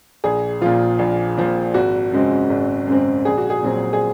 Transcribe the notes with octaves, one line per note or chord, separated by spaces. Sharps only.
A#1 G#4
A#2 F3 F4
A#1
A#2 F3
G#1 F#4
F#2 C#3 G#3 C4
G#1
F#2 C#3 G#3 C4
A#1 G#4
F#4
G#4
A#2 F#3 C4
G#4